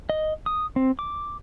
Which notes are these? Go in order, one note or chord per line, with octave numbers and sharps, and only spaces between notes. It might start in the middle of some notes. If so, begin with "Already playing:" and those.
D#5
D#6
C4
D6